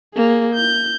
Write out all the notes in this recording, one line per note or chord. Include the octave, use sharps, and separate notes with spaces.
A#3 G#4
G6